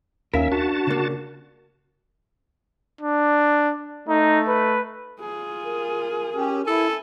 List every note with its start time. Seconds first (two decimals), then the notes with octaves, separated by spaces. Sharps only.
0.34 D#2 C#4 A#4 E5 F5 B6
0.52 D4 F#4 D5 A5
0.87 C#3 A#3
3.01 D4
4.08 A3 D#4
4.47 B4
5.20 F4 G#4
5.64 A#4
6.35 C#4 G4
6.67 E4 A4 G#5